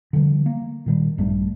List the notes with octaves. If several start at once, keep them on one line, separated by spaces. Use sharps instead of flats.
D3 E3 F3 G3
A#3
A#2 D#3 G3
A#1 G2 G3 A3